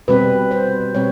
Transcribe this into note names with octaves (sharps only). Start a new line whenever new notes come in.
B2 G3 C4 B4
C5
B2 G3 C4 C#5